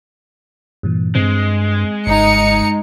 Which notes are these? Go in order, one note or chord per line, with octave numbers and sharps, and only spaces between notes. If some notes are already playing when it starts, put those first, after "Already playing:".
G2 A#2 E3
G2 G#3 C4
F#1 G2 D#4 C#7